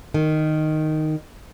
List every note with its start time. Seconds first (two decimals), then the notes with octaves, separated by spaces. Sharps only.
0.14 D#3